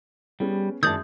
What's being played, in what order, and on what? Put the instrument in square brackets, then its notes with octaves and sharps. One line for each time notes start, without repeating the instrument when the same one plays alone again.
[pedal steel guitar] G3 [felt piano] B3 C#4 G#4
[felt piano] F#2 G#3 G#6 [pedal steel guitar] D#3 D5 A5 [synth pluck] D#6 G6